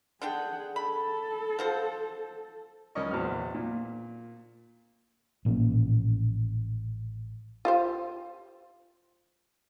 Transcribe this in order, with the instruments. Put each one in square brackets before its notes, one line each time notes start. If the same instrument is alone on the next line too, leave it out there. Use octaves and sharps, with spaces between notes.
[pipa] D3 D4 G5 [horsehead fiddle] G#4 F#5
[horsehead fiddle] A4 [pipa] B5
[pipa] F3 F#4 C5
[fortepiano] C#2 C#4 A#4 D5 D#5 C#6
A#1 E2 C4 F#4 F6
A#2
[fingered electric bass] A1 A#2 F3 C#4
[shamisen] F4 G4 C5